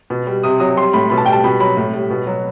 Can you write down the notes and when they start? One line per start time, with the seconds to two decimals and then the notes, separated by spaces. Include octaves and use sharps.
0.10 B2
0.27 G3
0.43 C3 D#6
0.60 F#3 D#6
0.77 G3 C6
0.93 A2 B5
1.10 B2 B5
1.18 A5
1.26 G3 G5
1.33 A5
1.44 B2 B5
1.60 F#3 B5
1.77 A2
1.93 G3
2.10 B2
2.27 F#3